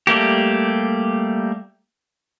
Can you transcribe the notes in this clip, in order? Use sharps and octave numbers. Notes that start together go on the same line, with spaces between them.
G3 A3 A#3 G4